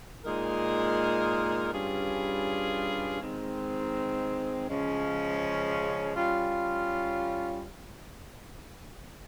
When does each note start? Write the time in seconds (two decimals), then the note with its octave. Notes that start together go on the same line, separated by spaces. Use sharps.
0.23 A#2 G#3 D#4 A#4
1.71 G2 G3 C#4 F4 G#4
3.20 D#3 G#3 C4
4.68 C#3 F3 G#3 C#4
6.15 G3 C#4 F4